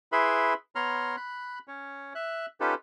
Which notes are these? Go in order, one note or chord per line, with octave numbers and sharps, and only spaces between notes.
E4 G#4 B4 E5 B5 C6
B3 C#5 A#5 C6 F6
B5 F#6
C#4 C#5
E5 F#6
C#4 D#4 F4 G4 A4 B4